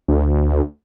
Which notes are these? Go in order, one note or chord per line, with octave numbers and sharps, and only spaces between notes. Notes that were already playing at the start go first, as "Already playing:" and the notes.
D2